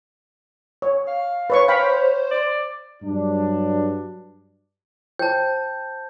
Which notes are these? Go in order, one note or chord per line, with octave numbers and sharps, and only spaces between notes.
C#5
F5
B4 C#5 C#6
C5 C#5 F5 G5 B5
D5
G2 F#3 D4
C5 G5 A5 G6